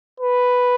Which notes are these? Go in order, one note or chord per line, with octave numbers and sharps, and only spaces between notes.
B4